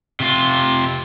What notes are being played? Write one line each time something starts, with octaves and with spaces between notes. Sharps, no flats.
C3 F4